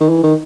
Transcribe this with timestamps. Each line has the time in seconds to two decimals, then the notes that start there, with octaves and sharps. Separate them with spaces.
0.01 D#3
0.09 E3
0.23 D#3